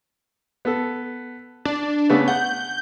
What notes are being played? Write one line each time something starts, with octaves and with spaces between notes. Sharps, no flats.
B3 A4
D4 D5
C#3 A3 B3
F#5 G6